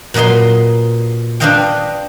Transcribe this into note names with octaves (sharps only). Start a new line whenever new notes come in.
A#2 F#3 B4 D#5 C6
D4 B4 C5 D#5 F5 G5